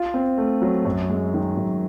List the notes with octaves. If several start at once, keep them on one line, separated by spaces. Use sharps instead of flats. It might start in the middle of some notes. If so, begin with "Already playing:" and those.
Already playing: F4
C4
A3
F#3
F#2
G#3
D#3
F#2